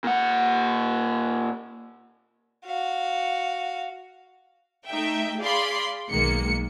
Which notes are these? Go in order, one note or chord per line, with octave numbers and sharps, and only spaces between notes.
A#2 F#5
F#4 F5
A3 D#4 E5 G5
G#4 D5 F5 B5 C6
B1 D#3 G#3 A#3 C#7